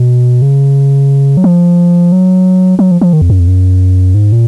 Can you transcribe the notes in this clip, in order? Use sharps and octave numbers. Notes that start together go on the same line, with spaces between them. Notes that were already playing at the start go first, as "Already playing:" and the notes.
Already playing: B2
C#3
F#3
F3
F#3
F#3
F3
F3
D#3
F2
F#2
F2
F#2
G#2
A#2